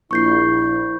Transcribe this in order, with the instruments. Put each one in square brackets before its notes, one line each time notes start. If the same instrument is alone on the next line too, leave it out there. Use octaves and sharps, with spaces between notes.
[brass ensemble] A#1 [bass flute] E4 [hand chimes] C#6 G6 C7